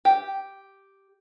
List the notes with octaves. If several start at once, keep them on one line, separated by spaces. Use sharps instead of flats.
G4